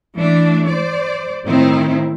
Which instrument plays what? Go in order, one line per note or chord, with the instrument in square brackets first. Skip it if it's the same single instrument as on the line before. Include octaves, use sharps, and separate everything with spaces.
[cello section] E3 A3 D4
C5 D5
A2 D#3 C4 D#4 E4